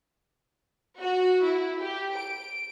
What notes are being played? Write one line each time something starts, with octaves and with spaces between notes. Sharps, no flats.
F#4
E4
G4
D7